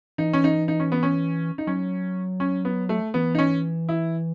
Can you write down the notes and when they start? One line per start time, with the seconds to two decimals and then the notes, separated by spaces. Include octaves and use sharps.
0.18 E3 D#4
0.33 C#4
0.44 D#4
0.68 D#4
0.80 C#4
0.92 B3
1.03 C#4
1.58 D#4
1.67 F#3 C#4
2.40 C#4
2.65 B3
2.89 A3
3.14 E3 B3
3.35 D#4
3.39 C#4
3.89 E4